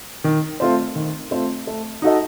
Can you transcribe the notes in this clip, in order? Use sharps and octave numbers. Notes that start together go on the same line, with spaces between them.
D#3
A3 C4 F4 C5
D#3
A3 C4 F4 C5
A3
D#4 F#4 A4 D#5